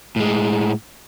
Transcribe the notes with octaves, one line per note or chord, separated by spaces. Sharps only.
A2 G#3